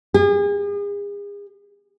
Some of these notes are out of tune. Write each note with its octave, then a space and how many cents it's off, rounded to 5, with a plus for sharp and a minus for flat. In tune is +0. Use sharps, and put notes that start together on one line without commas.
G#4 -40